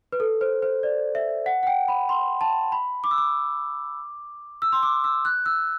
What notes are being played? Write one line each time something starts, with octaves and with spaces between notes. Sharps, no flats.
B4
A4
C5
C5
D5
E5
F#5
F#5
G5
B5
C6
A5
B5
D6
E6
D6
E6
C6
D6
E6
F#6
E6